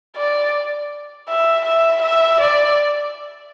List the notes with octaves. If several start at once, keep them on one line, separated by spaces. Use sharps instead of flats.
D5
E5
E5
E5
D5